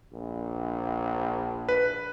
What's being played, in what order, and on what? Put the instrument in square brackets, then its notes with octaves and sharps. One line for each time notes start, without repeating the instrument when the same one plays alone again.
[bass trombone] A#1
[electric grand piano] B4